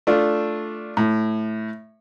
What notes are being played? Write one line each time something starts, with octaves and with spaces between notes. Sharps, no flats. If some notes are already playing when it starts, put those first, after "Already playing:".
A3 D4 F4
A2